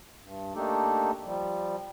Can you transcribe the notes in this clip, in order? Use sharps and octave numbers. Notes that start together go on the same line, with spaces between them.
G2
A3 A#3 D4 D#4 G4 A4
F3 G3